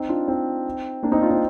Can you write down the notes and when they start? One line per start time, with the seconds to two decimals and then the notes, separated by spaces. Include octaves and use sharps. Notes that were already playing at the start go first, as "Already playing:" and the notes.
Already playing: C4 D#4
0.09 D4 F4
0.28 C4 D#4
1.03 A#3 D4
1.11 C4 D#4
1.21 D4 F4
1.30 C4 D#4